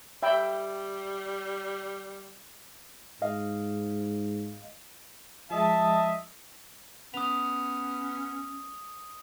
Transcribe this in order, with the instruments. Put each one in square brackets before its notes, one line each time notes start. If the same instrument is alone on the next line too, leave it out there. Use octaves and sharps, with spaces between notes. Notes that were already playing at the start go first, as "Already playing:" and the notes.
[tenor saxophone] G3 [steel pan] E5 G5 B5
[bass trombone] G#2 [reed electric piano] D#5 F5
[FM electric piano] F3 G#3 [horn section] D#5 E5 [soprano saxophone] A5
[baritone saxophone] B3 [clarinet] C#4 [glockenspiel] D#6 F7